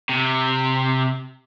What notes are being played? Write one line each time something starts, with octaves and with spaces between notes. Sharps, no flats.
C3